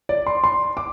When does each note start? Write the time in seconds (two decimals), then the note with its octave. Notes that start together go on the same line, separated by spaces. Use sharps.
0.09 D5
0.27 C6
0.44 C6
0.77 D6